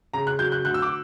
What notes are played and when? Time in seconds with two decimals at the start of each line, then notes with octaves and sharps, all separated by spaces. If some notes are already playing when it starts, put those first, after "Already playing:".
0.14 C#3 A#5
0.27 F#6
0.39 F#3 G6
0.52 F#6
0.65 D2 F#6
0.74 E6
0.82 D6